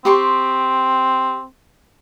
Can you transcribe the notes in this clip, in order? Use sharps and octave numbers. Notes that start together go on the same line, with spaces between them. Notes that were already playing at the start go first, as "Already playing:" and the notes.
C4 G4 C6 C#6